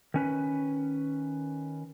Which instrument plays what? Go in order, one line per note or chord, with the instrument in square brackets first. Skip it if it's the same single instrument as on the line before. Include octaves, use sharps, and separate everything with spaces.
[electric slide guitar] D#3 C#4 B4